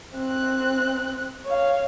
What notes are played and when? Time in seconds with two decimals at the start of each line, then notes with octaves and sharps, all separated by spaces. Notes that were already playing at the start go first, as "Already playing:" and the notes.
0.16 C4 F#6
1.45 C#5 F5